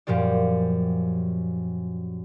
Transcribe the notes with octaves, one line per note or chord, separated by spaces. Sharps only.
F#2 A#2 F3 G4 D5